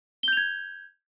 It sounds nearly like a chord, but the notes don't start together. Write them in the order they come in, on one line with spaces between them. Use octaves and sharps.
G7 G6 F7 G#6